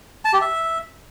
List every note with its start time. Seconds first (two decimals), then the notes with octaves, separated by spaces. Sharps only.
0.25 A5
0.33 G4
0.41 E5